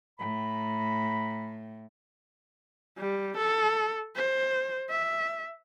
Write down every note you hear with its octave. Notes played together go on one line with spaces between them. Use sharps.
A2 A#5 B5
G3
A4
C5
E5